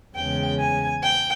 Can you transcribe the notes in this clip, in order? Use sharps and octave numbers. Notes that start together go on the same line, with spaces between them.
E2 C#3 G#3 G5
G#5
G5